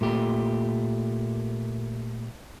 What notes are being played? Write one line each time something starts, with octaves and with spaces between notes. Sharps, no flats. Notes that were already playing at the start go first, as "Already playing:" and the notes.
A#2 A3 G4